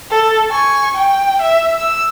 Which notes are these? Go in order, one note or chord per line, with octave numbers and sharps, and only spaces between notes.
A4
G#5 C#6
G5
E5
E6